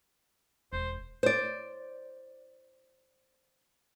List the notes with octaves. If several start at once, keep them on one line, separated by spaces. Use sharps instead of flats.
E1 C5
C5 D5